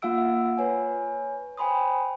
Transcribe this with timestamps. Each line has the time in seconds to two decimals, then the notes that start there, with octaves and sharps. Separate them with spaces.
0.02 A#3 F4 F5 F#5 E6 D7
0.58 B4 C#5 G#5
1.57 C5 G5 G#5 B5 C6 D#6